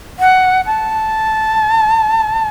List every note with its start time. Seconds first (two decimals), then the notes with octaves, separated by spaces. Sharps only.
0.19 F#5
0.66 A5